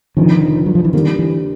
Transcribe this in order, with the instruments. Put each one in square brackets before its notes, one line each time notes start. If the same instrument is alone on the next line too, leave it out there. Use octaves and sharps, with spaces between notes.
[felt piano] F1 F2 D3 [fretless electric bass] D#3
[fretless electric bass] F#3
F3
E3
[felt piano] D3 G3 A#3 [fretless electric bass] D#3
[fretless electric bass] E3